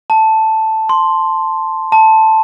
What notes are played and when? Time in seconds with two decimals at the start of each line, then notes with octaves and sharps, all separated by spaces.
0.10 A5
0.89 C6
1.92 A5